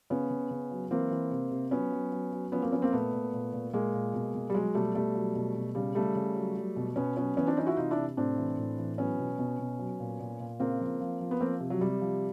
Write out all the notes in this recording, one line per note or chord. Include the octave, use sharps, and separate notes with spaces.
C#3 B3 C#4
C#3
C#3
F#3
E3 A#3 C4
E3
C3
C3
F#3 B3 C#4
F#3
F#3
F#3
F3 B3 C#4
A#3 C4
F3 B3 C#4
A#3 C4
A#2 A3 B3
A#2
A#2
A#2
A#2 G#3 A#3
A#2
B2
B2
G3
F#3 G#3
B2 G3 A3
B2 G3 A3
F#3
B2
B2
C#3 G3
C#3 G3 A3
C#3
F#3
F#3
B2
B2 B3 C#4
F#3 B3 C#4
E3 B3 C#4
C4 D4
E3 C#4 D#4
E4 F#4
C3 D#4 F4
D4 E4
C3
A2 C4 D4
E3
A2
E3
F#3 B3 C#4
B2
B2
B2
F#3
A#2
A#2
A#2
C#3 A#3 C4
F3
F3
F3
B3
F3 A#3 C4
C3
F#3
C3 G3
F3